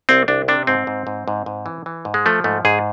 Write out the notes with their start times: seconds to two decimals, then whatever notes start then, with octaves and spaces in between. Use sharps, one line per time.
0.09 C2 C4
0.28 C2 D4
0.48 C3 D4
0.67 G#2 C4
0.87 G#2
1.07 G#2
1.28 G#2
1.46 G#2
1.66 E3
1.86 E3
2.05 G#2
2.14 G#3
2.26 F3 A3
2.44 G#2 A3
2.65 G#2 G#4